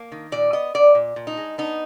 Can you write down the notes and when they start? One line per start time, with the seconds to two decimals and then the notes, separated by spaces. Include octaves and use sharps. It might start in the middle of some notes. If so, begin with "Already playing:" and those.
Already playing: A#3
0.12 D#3
0.32 A#2 D5
0.53 B3 D#5
0.74 B3 D5
0.95 A#2
1.16 A#2
1.27 D#4
1.37 G#3
1.58 B3 D#4